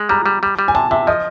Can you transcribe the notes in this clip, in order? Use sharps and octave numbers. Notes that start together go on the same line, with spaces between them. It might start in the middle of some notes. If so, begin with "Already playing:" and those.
Already playing: G#3
G3 A#5
G3
G3
G3
G#5
C3 A5
C3 E5
F3 D#5